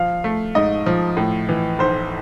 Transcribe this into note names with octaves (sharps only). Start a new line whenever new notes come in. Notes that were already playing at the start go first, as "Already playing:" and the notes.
Already playing: F3 F5
A3
G#2 D#5
F3
A2
E3
B1 C5